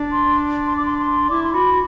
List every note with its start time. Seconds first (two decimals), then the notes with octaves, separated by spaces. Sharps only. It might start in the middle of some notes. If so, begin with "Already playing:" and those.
Already playing: D4
0.12 C6
0.67 C6
0.77 D6
0.86 C6
0.99 C6
1.30 E4 D6
1.43 C6
1.54 F#4 B5